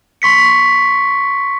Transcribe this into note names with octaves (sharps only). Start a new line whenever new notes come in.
C6 C#6 B6 C#7